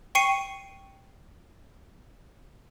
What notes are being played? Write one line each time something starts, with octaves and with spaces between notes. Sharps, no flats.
G5 C#6 C7 C#7 D#7